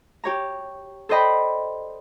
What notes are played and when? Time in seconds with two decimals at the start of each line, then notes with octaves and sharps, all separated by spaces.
0.24 G4 C#5 A#5
1.09 A4 C5 D5 D#5 G5 B5